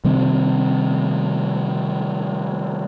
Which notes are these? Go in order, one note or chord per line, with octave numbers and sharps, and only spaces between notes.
C3 D#3 G3 C4